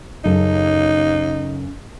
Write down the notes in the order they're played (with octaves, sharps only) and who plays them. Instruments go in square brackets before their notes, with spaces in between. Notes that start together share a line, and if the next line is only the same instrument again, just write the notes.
[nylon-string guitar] F#2 C#3 A4 [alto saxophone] D#4